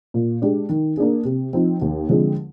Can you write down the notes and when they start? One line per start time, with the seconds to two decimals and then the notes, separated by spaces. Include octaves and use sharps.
0.14 A#2
0.42 G#3 D4 G4
0.69 D#3
0.97 A#3 D4 G#4
1.25 C3
1.53 F3 C4 D#4
1.81 D#2
2.09 D3 F3 G#3 C4